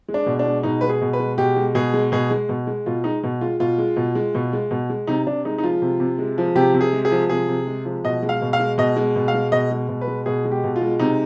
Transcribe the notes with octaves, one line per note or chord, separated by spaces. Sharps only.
G#3
D4
B2
D4
G#3
B2 D#4
G#3 B4
G#4
B2
B4
G#3
B2 G4
G#3
B2 G#4
G#3
B2 G#4
G#3
B2
G#3
B2 F4
G#3 D#4
B2
G#3 F4
B2 F4
G#3
B2
G#3
B2
G#3
B2
G#3
C3 D#4
C3 D4
G#3 D#4
D#4
F3 F4
C3
C3
G#3
F3
C3 G4
C3
G#4
G#3
G#4
F3
C3 G#4
C3
G#3
F3
B2 D#5
G#3
F5
B2
F5
G#3
B2 D#5
G#3
B2
F5
G#3
B2 D#5
G#3
B2
B4
G#3
B2 G#4
G#3
G4
B2
F4
G#3
C3 D#4